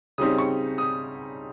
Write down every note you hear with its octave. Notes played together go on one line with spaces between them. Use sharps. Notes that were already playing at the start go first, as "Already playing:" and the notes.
C#3 G3 C4 D#4 D#6
C#6
D#6